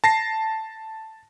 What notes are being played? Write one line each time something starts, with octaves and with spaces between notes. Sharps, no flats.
A5 A#6 C7